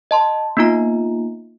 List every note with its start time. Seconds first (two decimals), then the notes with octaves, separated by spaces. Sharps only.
0.11 D#5 A5 C6
0.57 A#3 B3 D#4 F4 A#5